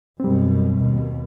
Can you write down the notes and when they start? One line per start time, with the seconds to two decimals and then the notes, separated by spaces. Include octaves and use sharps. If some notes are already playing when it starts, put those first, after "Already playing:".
0.20 F#2 B2 G3 C4
0.78 D#2 B2